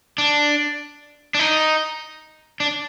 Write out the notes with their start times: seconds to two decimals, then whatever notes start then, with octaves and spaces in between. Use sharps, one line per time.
0.18 D4
1.35 D4
1.39 D#4
2.60 D4